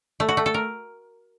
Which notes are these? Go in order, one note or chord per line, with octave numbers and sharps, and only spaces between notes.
A3
F#4
A3
A4
A#4